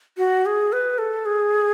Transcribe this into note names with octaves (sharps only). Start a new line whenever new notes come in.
F#4
G#4
B4
A4
G#4